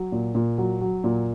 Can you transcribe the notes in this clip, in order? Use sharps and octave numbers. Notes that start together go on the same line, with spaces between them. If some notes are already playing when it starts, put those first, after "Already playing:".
Already playing: F#3
A#2
A#2
F#3
F#3
A#2